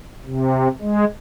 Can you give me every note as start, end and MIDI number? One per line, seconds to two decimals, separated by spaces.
0.25 0.68 48
0.81 1.05 56